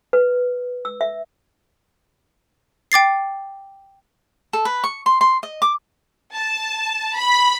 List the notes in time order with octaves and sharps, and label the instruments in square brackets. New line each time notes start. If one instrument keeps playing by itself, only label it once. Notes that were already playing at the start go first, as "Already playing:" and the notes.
[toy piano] B4
E6
E5
[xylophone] G5 D6 A6 C7
[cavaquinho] A4
B4
C#6
C6
C6
D#5
D6
[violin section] A5
B5